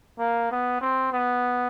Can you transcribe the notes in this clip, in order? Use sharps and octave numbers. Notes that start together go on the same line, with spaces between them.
A#3
B3
C4
B3